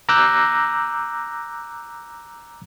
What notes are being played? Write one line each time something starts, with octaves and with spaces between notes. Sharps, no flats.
A#5 D6 E6 F#6 G6 A#6